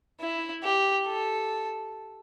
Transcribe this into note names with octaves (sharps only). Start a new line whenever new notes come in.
E4
G4
A4